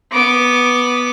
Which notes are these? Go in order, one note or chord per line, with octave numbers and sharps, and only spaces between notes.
B3 D6